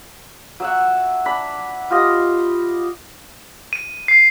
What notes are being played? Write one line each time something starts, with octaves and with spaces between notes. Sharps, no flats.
F#3 E5 F#5
D4 B5
F4 G4 D#5
D#7
C7